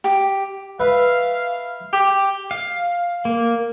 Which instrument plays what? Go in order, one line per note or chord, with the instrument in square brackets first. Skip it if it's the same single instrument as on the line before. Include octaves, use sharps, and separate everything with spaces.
[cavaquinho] G4
[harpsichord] B4 E5 [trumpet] F5
[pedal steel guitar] G4
F5
A#3